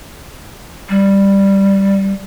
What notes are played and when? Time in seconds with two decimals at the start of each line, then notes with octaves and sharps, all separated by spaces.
0.89 G3